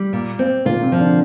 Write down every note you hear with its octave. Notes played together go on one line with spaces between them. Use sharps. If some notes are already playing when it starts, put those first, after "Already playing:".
Already playing: G3
A#2
C4
A#2 A#3 F4
C3 C4
F3
D3 D4